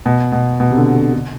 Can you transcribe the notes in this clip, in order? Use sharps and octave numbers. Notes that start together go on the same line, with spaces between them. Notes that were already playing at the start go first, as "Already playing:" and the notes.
B2
B2
B2
C3
D3
D3
D3